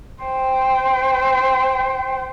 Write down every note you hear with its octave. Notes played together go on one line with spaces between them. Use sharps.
C5 G5